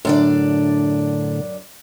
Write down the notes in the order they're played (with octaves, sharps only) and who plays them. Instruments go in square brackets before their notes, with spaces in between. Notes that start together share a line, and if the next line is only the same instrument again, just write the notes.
[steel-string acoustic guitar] F#2 D4 D5 [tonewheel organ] A2 D3